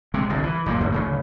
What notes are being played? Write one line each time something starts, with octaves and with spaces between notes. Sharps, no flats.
C3 G#3
G1 C2 G2
E3
F#1 A#2 F3 A#3
F#2 A2 D#3
D1 C#3 A3